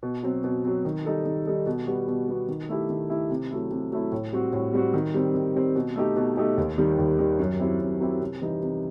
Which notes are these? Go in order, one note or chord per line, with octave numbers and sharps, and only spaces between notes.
B2
F#3 C4
B2
F#3 C4
D#3
G3 D#4 A4
D#3
G3 D#4 A4
B2
G3 B3 F#4
B2
G3 B3 F#4
D#3
A3 E4 G4
D#3
A3 E4 G4
C3
F#3 A3 E4
C3
F#3 A3 E4
A2
G3 C4 F#4
A2
G3 C4 F#4
D#3
G3 C4
D#3
G3 C4
B2
A3 D#4 G4
B2
A3 D#4 G4
D#2
D#3 G3
D#2
D#3 G3
F#2
F#3 C4 E4 G4
F#2
F#3 C4 E4 G4
C3
E3 G3 D#4
C3